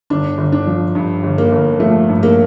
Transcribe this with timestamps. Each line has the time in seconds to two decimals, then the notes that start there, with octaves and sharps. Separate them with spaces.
0.10 G1 D4
0.38 G1
0.52 D4
0.67 F3
0.95 G2
1.23 G1
1.38 A#3
1.51 G1
1.80 F3 A3
2.08 G2
2.23 A#3